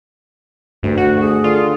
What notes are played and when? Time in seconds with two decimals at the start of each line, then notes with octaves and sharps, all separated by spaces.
0.83 D2 G2
0.97 F#4 F#5
1.19 G#4
1.44 D3 F4